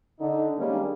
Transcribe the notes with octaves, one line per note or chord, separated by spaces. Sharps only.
D3 D#4
D#3 G3 G#3 A#3 C#4 D4